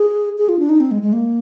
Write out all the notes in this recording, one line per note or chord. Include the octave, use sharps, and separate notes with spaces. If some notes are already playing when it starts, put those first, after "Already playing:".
Already playing: G#4
G#4
F4
D4
D#4
C4
G#3
G#3
A#3